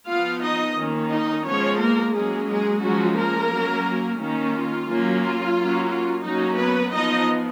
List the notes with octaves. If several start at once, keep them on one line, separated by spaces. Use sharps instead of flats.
F3 B3 F4 F5
D#4 D#5
D#3 A#3 C#4
D#4 D#5
F3 G#3 B3 C#4 C#5
A#3 A#4
F#3 G#3 A#3 C#4 G#4
G#3 G#4
F3 F#3 G#3 C#4 F#4
A#3 A#4
F#3 C#4
D#3 A#3 C#4
F4
F#3 A#3 C#4
F4
F#3 A#3 C#4
F4
F#3 A#3 C#4 D#4
B3 B4
F3 B3 D#4 D#5